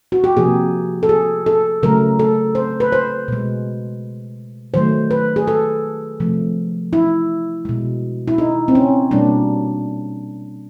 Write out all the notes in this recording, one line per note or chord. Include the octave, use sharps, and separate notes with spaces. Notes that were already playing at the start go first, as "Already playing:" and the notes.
F#4
G4
C3 F3 A#3 G#4
A4
G#4
A4
C#3 F#3 A3 A#4
A4
C5
B4
C5
B2 G#3
D#3 F#3 A3 C5
B4
G#4
A4
C3 F3 A3
E4
B2 G#3
E4
D#4
C4
C#4
B2 G3 A#3 D4